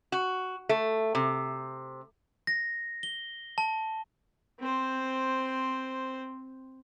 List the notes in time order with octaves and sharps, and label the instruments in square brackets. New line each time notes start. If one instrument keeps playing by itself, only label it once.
[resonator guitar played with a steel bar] F#4
A3
C3
[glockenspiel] A#6
G7
A5
[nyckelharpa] C4 C5